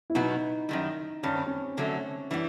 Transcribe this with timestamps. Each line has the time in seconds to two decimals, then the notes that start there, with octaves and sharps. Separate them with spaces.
0.10 E4
0.15 B2 F#3 B3 D#4
0.69 F#2 D#3 G3
1.23 G2 D#3 G3 C#4
1.35 C4
1.46 C#4
1.77 F#2 D3 F#3 A3
2.31 E3 G3 B3 D4